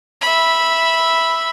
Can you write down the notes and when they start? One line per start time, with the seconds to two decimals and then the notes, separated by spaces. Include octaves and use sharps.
0.21 E5 B5